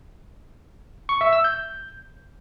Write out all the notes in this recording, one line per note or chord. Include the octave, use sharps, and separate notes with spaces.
C#6
E5
E6
G6